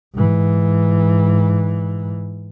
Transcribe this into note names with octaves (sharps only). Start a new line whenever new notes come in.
G#2 E3